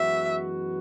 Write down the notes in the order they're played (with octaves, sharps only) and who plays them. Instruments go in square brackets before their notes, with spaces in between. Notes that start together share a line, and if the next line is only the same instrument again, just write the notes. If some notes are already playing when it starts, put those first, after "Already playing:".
Already playing: [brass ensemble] F#2 E3 G#3 B3 F#4 [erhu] E5